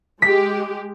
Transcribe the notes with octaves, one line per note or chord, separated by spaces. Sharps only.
G#3 G4 B6